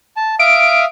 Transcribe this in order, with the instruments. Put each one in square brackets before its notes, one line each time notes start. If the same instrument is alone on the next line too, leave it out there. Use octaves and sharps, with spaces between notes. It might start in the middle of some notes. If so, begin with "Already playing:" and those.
[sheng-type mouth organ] A5
[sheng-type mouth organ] E5 F5 D#6 [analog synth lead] D7